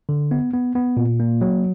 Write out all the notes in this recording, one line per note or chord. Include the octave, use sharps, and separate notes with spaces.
D3
B3
B3
B3
A#2
A#3
F#3